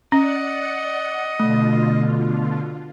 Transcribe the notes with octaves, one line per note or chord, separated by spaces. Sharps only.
C#4 D5 D#5 F#5 C#7
B2 D3 A3 F4